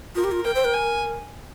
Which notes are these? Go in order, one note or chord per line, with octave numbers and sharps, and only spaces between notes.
F4 A#4
G4
F4
A#4 G5
C5
A#4
G#5